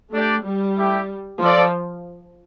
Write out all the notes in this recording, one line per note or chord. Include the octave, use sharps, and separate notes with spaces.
A3 D4 G4 D5 G5
G3
A3 E4 G4
F3 F4 A4 D5